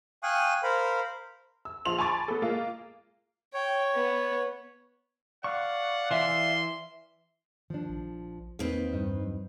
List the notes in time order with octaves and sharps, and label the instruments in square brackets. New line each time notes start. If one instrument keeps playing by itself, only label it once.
[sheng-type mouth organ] F5 G5 G#5 C#6 D#6 F#6
A#4 C5 F5 B5
[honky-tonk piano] E6
A#1 F3 C6 F7 F#7
G#5 A5 B5 C#6 D6 A6
B3 A4
G#3 A#3 F4
[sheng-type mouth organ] C#5 [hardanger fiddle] G5
[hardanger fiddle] B3
[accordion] D5 F5 [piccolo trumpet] F#5 [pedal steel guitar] C#6
[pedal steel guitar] E3 E5 [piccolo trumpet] C6
[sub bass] D#3 [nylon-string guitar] F3 D4
[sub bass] A#1
[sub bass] E2 [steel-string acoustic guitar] D#3 C4 B4 [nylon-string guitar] A#3
[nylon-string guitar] G2 D#4
[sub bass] F#3